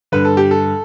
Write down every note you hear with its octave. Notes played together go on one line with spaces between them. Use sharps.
G2 D3 B4
A4
G4
A4